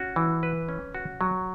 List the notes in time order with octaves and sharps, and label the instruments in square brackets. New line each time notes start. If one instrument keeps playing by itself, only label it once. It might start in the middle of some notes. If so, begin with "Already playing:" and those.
Already playing: [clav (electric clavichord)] C#4 F#4
E3
B4
C#4
F#4
F#3